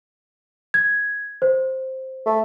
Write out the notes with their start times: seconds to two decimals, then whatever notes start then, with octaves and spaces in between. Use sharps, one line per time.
0.74 G#6
1.42 C5
2.26 A3